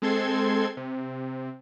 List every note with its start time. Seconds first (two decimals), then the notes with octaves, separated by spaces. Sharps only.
0.02 G#3 C4 A4 C6 G#6
0.77 C3